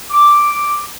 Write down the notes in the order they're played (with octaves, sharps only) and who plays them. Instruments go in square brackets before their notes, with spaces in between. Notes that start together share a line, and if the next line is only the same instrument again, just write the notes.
[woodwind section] D6